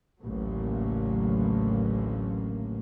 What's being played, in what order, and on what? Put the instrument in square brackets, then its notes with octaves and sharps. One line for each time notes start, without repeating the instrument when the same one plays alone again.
[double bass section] A1 D2 C#3 F#3 A3 A#3